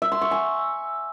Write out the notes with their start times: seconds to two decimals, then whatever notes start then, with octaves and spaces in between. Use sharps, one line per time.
0.02 E5
0.12 C6
0.21 C#6
0.31 G#5